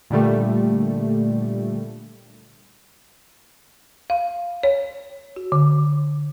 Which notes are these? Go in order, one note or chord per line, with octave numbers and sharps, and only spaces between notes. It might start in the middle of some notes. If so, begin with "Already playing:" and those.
A#2 D3 G3 A3
F5
C#5
F#4
D3